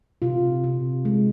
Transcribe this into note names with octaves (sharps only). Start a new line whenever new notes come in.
C3 F4
C3
G#3